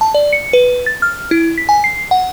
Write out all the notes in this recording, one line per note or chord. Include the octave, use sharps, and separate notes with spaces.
A5
D5
C#7
B4
A6
F6
E4
B6
G#5
C7
F#5